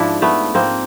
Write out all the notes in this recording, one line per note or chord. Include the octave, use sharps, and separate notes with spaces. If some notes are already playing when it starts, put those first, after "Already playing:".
Already playing: G#2 F3 D4 E4
A3 B3
G#2 F3 A#3 C4